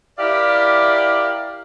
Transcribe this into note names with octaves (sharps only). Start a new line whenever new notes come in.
E4 G4 A#4 D5 E5 F5